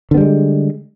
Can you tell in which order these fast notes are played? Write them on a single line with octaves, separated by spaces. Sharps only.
D3 B3 G3 G#3